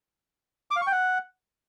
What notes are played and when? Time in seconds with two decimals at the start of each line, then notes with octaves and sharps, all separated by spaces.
0.71 D6
0.76 F5
0.81 C#6
0.87 G5
0.92 F#5